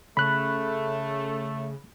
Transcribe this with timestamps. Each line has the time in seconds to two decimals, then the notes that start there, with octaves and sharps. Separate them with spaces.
0.17 C#3 A3 B5 F#6